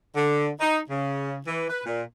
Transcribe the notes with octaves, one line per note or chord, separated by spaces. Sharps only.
D3
D#4
C#3
E3
B4
A#2